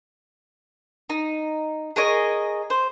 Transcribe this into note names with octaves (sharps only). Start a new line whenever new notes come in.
D#4
G#4 A#4 C#5 D#5
C5